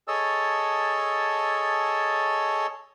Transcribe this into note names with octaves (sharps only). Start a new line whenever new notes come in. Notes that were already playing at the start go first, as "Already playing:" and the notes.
G#4 A4 C#5 D#5 A5 E6